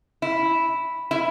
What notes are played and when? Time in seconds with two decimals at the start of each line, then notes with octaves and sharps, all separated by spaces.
0.22 E4
1.11 E4